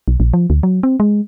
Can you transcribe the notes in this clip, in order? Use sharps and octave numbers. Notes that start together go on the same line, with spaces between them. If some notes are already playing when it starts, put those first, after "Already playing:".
B1
A#1
F3
D2
F#3
C4
G#3